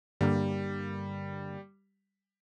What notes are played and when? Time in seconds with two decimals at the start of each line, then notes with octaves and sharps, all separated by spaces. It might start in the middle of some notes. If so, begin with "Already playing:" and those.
0.21 G2 D3 G3 A#3